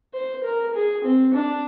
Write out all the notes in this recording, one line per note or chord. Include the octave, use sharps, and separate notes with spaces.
C5
A#4
G#4
C4
D4